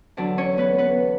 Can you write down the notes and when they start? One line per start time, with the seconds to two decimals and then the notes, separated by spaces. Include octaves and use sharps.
0.17 E2 D3 F#3 D4 D5
0.38 C#4 C#5
0.58 B3 B4
0.78 B3 B4